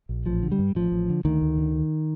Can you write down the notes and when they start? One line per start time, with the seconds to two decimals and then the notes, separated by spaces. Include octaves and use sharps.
0.09 A#1
0.26 A1 F3
0.43 D3
0.52 G3
0.59 G2
0.75 A1 F3
0.92 A1
1.09 D3
1.25 D2 D#3
1.41 D2
1.58 D3